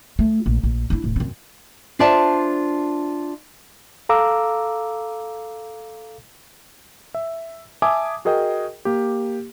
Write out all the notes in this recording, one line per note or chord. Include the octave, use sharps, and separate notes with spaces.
A3
A#1
A#1
D4 E4
D1
F#2 C4
D4 F4 C5 D5 E5 A5
A4 F5 A#5 D6 E6
E5
E5 G#5 A5 D6 D#6
F#4 G#4 A#4 D#5 G5
A#3 G4